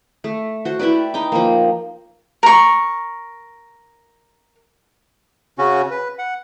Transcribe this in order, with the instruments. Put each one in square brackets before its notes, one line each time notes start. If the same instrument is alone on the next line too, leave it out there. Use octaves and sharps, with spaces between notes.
[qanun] A3
F#4 C5
E4 G4 B4 D5
D#4 G5 D6
F3 A#3
[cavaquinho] A#4 C#6
[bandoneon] C#3 C#4 F#4
B4
F#5